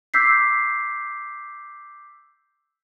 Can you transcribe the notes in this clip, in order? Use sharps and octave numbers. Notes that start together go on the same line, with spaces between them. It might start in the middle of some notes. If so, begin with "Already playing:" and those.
D6 E6 G6 B6 C7